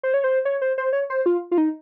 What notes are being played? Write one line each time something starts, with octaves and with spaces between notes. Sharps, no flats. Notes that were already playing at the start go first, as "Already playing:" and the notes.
C5
C#5
C5
C#5
C5
C5
C#5
C5
F4
F4
D#4